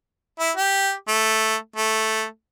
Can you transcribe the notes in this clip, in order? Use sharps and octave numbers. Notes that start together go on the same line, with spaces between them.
E4
G4
A3
A3